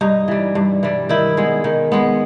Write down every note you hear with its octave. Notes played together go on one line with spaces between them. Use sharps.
G2 D#4
E3 G3
G2
E3 G3
D#3 E4
G#3 B3
D#3
G#3 B3